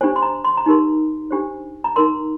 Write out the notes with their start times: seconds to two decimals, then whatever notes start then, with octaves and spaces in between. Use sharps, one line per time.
0.01 D4 G4 C5 G#5
0.16 C6
0.22 A#5
0.44 C6
0.57 A#5
0.66 D#4 G4 A#4 C6
1.31 D4 G4 C5
1.84 A#5
1.96 D#4 A#4 C6